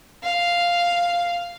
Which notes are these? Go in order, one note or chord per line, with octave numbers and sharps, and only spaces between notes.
F5